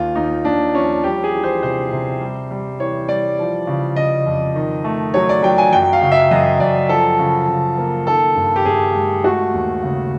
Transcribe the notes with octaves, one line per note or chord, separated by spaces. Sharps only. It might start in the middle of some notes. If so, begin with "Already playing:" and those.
Already playing: D#2 F4
D#2 D#4
D#2 D4
F3 C#4
G3 G4
G#4
E3
C5
C3 C5
C3
G3
G3
E3 C#5
G3 D5
F3
C#3
C#3 D#5
F2
D#3
A3
F#3 C#5
D5
F#3 G5
G#5
F#2 G5
F5
C#3
E5
F#2 D#5
F#2 D5
F3 A4
C#3
C#3
A#3
D#3 A4
G2
G4
G2 G#4
G#3
A3 F#4
D#2
C#3